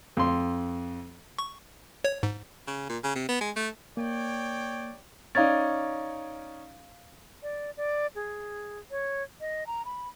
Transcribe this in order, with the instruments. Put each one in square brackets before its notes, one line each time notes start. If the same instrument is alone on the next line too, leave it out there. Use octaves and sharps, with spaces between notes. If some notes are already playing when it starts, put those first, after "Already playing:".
[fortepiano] F2 C6
[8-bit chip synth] C#6
C#5
G#2
[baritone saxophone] C#3
A#2
C#3
C3
B3
G#3
A3
[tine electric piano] A#3 [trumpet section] C#5 D5 G5
[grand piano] C#4 D#4 D5 [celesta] F5 G#6 A6
[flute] D5
D5
G#4
C#5
D#5
A#5
B5